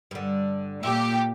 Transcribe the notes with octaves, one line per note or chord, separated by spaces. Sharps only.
G2 D3
A#2 G4 E5